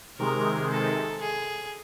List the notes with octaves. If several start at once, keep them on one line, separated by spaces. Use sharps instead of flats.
C3 D#3 G#3 A#4
A4
G#4